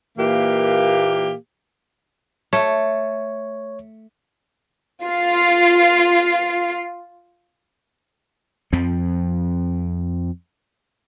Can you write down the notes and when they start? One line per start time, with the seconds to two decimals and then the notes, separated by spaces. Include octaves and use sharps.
0.16 A#2 E3 A#3 G4
2.53 A3 C#5
5.05 F4 C7
8.73 F2 F3 C4